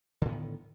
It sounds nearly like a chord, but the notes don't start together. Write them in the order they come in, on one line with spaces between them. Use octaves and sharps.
D3 A2 B3 D#3